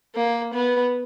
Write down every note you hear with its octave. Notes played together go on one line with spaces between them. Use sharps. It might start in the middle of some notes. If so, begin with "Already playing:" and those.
A#3
B3